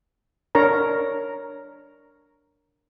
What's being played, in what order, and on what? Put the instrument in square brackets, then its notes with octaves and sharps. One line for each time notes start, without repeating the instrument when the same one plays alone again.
[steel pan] D4 A#4 C#5 A#5